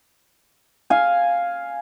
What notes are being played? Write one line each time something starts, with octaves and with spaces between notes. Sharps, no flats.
F5 G#5